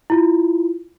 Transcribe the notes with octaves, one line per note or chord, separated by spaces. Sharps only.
E4 F4